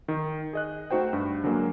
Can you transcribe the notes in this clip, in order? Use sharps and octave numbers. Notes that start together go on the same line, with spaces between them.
D#3
G#4 D#5 F#6
A3 D#4 F#4 C5 G5
G2
D3 F#3 G#3 A#3